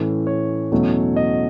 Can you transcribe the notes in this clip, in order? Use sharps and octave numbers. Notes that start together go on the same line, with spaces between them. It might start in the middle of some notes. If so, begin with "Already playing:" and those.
Already playing: A2 E3 A3 C#4
C#5
E2 B2 F#3 A3 C#4
D#5